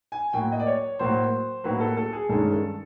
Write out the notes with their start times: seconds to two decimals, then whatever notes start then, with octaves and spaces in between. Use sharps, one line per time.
0.12 G#5
0.33 A2 F#3 A#3 G5
0.52 D#5
0.60 D5
0.67 C#5
0.99 A2 F#3 A#3 C5
1.64 A2 F#3 A#3 B4
1.80 A4
1.97 A4
2.13 G#4
2.29 G2 D#3 G#3 C#4 A4
2.52 A4